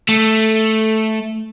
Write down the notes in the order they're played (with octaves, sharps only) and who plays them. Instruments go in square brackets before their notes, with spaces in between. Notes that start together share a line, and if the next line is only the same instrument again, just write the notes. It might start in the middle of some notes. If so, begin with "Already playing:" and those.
[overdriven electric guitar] A3